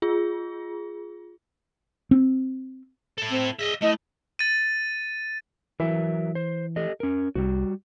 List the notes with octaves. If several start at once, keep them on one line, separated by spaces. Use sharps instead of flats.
F4 G#4
C4
E4 A4
C4
G#4 D#5 E5
A3 E4 D#5
A6 D#7
E3 F#3 A#4 E5
C5
G4 A4 D#5
C#4 A#4
C2 G3 F#4